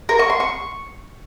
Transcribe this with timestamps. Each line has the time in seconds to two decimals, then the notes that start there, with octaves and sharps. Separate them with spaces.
0.09 A#4
0.19 C#6
0.30 C6
0.40 C#6